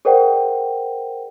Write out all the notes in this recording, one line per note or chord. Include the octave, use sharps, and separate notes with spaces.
G#4 A#4 C5 D5 F#5 G5